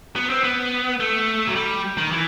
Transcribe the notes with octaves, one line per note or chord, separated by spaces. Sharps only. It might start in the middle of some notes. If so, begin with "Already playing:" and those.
B3
C4
B3
A3
F#3
G3
D#3
E3